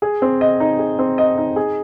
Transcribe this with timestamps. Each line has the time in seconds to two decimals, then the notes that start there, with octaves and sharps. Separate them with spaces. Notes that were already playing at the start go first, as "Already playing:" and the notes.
0.02 G#4
0.22 C4
0.41 D#5
0.60 D#4
0.79 G#4
0.99 C4
1.18 D#5
1.38 D#4
1.56 G#4